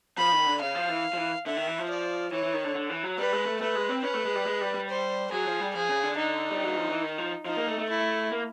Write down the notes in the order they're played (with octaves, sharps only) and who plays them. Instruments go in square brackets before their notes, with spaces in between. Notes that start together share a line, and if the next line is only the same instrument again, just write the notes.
[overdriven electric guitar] F3 [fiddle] B5
[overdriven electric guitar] D#3
D3
[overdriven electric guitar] C#3 [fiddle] F5
[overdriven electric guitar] F3
E3
F3
E3
[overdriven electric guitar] D3 [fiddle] E5
[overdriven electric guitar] D#3
E3
F3
[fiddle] D5
[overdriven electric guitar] E3 [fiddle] C#5
[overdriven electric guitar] E3
D#3
D3
D3
E3
F#3
[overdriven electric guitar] G3 [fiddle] B4
[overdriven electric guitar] G#3
A3
[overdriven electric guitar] A3 [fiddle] B4
[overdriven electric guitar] G#3
C4
[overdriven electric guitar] C#4 [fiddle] B4
[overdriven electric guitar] A3
G#3
G3
G#3
G3
G3
[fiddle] C5
[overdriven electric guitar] F#3 [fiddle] G#4
[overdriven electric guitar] F3
G3
[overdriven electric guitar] F3 [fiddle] G#4
[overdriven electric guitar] C#3
D3
[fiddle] D#4
[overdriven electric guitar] G3
F#3
F3
E3
D#3
F3
[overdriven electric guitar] F3 [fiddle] D#4
[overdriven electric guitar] A#3
A3
A3
[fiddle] E4
[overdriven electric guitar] A#3